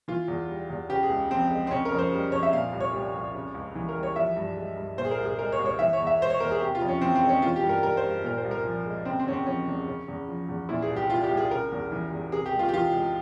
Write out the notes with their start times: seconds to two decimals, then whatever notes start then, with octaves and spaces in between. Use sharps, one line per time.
0.08 E3 F4
0.28 E2
0.48 G3
0.70 E2
0.89 C#3 G4
1.03 G#4
1.10 C#2
1.31 F3 C4
1.51 G#3
1.67 C4
1.71 C#3 C#4
1.85 A#4
1.92 F2
1.98 C5
2.12 G3
2.32 F2 C#5
2.43 E5
2.52 A#2 F5
2.73 C2
2.80 C#5
2.93 G3
3.14 C2
3.34 C#3
3.54 C#2
3.75 E3
3.89 A#4
3.95 G3
4.03 C#5
4.16 F3 E5
4.36 G2
4.56 G#3
4.77 G2
4.98 A#2 C5
5.05 G#4
5.11 A#4
5.19 C2
5.25 G#4
5.38 G#3 A#4
5.52 C#5
5.59 C2
5.66 C#5
5.79 E3 E5
5.93 C#5
5.99 E2
6.07 E5
6.21 G#3 C5
6.30 C#5
6.40 E2 A#4
6.51 G#4
6.61 C3 G4
6.75 F4
6.82 F2
6.88 C#4
7.01 E3 C4
7.15 C4
7.22 G#3
7.29 C#4
7.42 E3 F4
7.56 G4
7.63 G2
7.69 A#4
7.83 G3 A#4
7.97 C5
8.04 G2
8.24 A#2 A#4
8.38 C5
8.44 C2
8.51 A#4
8.65 F3
8.86 G#3
9.05 C#3 C4
9.19 C4
9.27 E2 C#4
9.33 C4
9.46 F3 C#4
9.67 E2
9.88 C#3
10.08 E2
10.28 F3
10.49 E2
10.69 A#2 E4
10.82 G#4
10.90 C2
10.96 G4
11.10 G3 F4
11.24 G4
11.30 C2
11.37 G#4
11.50 C#3 A#4
11.72 E2
11.92 E3
12.11 E2
12.32 C3 G#4
12.46 G4
12.53 C#2
12.59 F4
12.69 G4
12.73 E3 F4
12.93 C#2